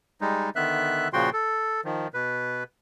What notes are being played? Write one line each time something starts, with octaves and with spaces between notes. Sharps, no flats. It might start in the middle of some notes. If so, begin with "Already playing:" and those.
G3 G#3 D#4
D3 D#3 B3 E5 F#6
A#2 C#3 F3 F#4 G5 C6
A4
D#3 F3
B2 B4